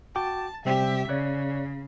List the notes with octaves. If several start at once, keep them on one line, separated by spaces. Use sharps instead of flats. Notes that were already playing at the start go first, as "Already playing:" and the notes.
F#4 G5 A5 D6
C3 G3 C4 G4 E5
C#3 C#5 D5 F#6